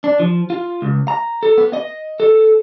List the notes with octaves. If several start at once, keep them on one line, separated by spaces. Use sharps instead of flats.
D4
F3
F4
C#2
A#5
A4
B3
D#5
A4